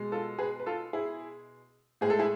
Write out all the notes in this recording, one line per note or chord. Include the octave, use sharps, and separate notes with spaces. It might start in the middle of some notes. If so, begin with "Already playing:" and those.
Already playing: B2 G#3
F4 A4
G#4 B4
B4
F4 A4
E4 G#4
A2 G#3 G#4
A4
E4 G#4